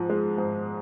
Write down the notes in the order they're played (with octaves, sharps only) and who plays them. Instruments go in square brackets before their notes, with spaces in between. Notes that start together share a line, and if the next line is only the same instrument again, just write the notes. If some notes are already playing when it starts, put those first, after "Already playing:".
Already playing: [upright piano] G#2 F3
G#3
G#2